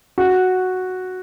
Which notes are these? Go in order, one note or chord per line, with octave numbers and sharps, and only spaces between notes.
F#4